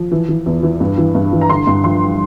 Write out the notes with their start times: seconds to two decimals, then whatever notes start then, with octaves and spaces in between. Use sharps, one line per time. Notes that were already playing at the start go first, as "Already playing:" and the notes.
Already playing: F3
0.12 E3
0.29 E3
0.46 E2
0.63 E3
0.80 G2
0.98 E3
1.15 G2
1.33 E3
1.41 A#5
1.50 D3 C6
1.67 G2
1.84 F3 C6